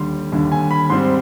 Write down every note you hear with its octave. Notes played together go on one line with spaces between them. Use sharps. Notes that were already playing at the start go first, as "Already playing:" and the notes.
Already playing: D#2 D3 G3 C6
D#2 D3 G3
G#5
B5
G#2 G3 C4 C6